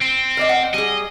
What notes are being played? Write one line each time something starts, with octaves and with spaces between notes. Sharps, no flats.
C4
A#4 D5 D#5
F#5
G3 G#4 D#5